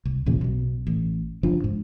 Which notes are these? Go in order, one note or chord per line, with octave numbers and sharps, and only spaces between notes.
C2
A#1 E2 A#2 C#3
B1 B2
A1
F#1 F3 D4
G#2